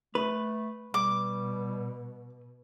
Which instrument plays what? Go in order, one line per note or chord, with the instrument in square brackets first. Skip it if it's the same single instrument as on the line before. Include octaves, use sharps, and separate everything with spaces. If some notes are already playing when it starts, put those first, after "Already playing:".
[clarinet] A3 [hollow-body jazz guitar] B4
[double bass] B2 [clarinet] G3 [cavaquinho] D6